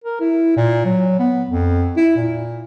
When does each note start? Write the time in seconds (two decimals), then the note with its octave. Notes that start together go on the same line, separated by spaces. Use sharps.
0.04 A#4
0.20 E4
0.56 A#2
0.85 F#3
1.19 B3
1.49 F2
1.97 E4
2.16 A#2